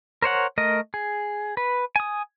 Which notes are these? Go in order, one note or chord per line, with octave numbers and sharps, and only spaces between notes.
A#4 C5 C#5 F#5
A3 A#4 D#5
G#4
B4
G#5 D#6